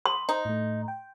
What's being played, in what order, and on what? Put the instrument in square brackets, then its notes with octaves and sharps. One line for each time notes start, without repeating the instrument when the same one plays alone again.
[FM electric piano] B5 D#6 [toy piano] C6
[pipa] D#4 [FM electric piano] C5
[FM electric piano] A2 A3
G5